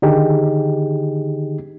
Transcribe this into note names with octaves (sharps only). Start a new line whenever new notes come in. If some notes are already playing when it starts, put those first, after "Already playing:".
D3 D#3 D#4 G4 G#4